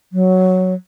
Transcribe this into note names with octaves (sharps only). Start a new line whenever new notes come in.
F#3